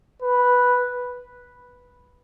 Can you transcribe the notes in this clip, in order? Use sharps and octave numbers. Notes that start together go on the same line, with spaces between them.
B4